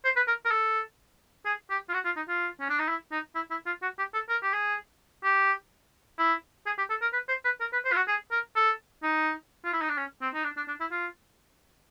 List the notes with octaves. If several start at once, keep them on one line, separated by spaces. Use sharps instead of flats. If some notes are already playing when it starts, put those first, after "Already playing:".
C5
B4
A#4
A#4
A4
G#4
G4
F4
F#4
F4
D#4
F4
C#4
D4
D#4
E4
D#4
E4
E4
F4
F#4
G4
A4
A#4
G4
G#4
G4
E4
G#4
G4
A4
A#4
B4
C5
B4
A#4
B4
C5
F4
F#4
G#4
A#4
A4
D#4
F4
E4
D#4
D4
C#4
C4
D#4
D4
D4
D4
E4
F4